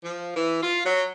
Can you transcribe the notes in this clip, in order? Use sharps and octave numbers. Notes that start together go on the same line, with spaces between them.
F3
E3
F4
F#3